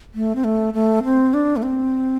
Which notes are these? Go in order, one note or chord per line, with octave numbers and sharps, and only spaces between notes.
A3
C4
A3
A3
C4
D4
A3
C4